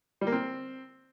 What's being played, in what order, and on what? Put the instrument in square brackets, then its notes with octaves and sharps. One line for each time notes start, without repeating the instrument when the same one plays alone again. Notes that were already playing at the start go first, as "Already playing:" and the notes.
[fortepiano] G3
A#3
C4